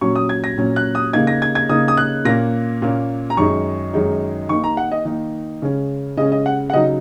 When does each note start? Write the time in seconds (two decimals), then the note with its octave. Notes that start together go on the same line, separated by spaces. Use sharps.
0.01 A#2 F#3 C#4 C#6
0.16 D#6
0.29 G#6
0.44 A#6
0.58 A#2 F#3 C#4
0.76 F#6
0.95 D#6
1.13 C#3 A#3 D#4 G#6
1.27 A#6
1.42 G#6
1.55 G#6
1.69 C#3 A#3 D#4 D#6
1.88 D#6
1.97 F#6
2.25 A#2 A#3 C#4 A#6
2.82 A#2 A#3 C#4
3.30 A#5
3.37 F#2 D#3 G#3 D#4 C#6
3.93 F#2 D#3 G#3 D#4
4.49 D#3 A#3 D#4 C#6
4.64 A#5
4.77 F#5
4.92 D#5
5.05 D#3 A#3 D#4
5.62 C#3 G#3 C#4
6.17 C#3 G#3 C#4 D#5
6.32 D#5
6.46 F#5
6.70 F#5
6.73 C#3 F#3 D#4 D#5